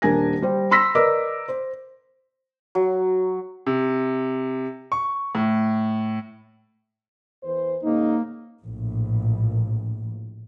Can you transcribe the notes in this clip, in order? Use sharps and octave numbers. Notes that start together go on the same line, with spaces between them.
D#1 D4 A#4 G#5 A#6
G3 C5
B5 C6 E6 A#6 B6
A#4 B4 D5 D#5 D6 E6
C5
F#3
C3
C#6
A2
E2 E3 C5
G#2 C#3 A#3 D#4
A#1 A2